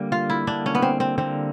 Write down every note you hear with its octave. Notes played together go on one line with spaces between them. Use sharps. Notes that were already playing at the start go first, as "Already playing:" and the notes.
Already playing: D3 G3 A#3
F4
E4
D3 G3 A#3 D4
C#4
B3
C4
C4
D3 G3 A#3 C4